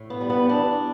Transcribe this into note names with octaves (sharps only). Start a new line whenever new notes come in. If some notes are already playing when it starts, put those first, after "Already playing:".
Already playing: A2
B3
G3
B3
E3 D4